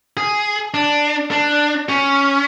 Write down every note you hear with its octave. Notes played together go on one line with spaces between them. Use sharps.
G#4
D4
D4
C#4